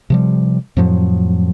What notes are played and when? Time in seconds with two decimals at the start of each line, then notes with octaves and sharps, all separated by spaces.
0.10 C3 F3 G3
0.77 F2 A2 F3 F#3